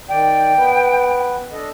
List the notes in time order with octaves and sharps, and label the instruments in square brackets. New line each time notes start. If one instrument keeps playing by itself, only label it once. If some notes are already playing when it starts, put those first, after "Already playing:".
[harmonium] D#3 D5 [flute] G5
[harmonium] B3 B4
D4 A4 D#5